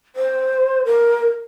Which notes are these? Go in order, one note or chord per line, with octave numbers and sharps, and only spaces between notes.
C5
A#4